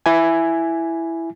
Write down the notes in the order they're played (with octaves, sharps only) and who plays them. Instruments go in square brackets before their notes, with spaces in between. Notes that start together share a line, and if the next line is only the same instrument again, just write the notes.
[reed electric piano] E4 G#5